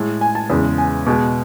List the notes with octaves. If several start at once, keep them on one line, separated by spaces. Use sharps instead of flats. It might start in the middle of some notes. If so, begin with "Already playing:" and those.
Already playing: A2 G#3
G#5
A5
E2 C#3 G#3
G#5
B2 G#3